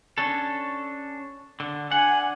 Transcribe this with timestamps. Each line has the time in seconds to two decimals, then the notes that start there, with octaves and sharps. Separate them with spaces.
0.18 C#4 D4 A4
1.60 D3
1.91 D4 F#5 G#5